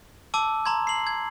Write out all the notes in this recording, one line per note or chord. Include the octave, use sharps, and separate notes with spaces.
A5 D6 E6
A5 A#5 C6 G#6
C7 F#7
G#6